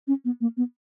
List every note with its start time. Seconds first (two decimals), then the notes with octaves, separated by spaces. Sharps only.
0.07 C#4
0.25 B3
0.41 A#3
0.57 B3